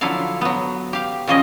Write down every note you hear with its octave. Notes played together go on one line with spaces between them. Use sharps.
D3 F3 F#3 E4 A4 F5
F#3 B3
G4 F5
A#2 C#3 F3 C#4 D#5